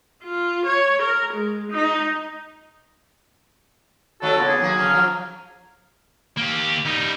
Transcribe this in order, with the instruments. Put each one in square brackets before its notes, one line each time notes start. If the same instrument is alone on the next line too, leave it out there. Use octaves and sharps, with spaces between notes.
[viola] F4
C#5
A#4
G#3
D#4
[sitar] D#3 G3 A3 [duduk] F#4 [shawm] A4 [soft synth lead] C#5
[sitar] A#2 C#3 [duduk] B3
[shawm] G#4
[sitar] D#2 A#3 F#4 [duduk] F#3
[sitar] C#3 C#4 [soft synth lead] F6
[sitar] F3
[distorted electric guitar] A#3 G4
G3 D#4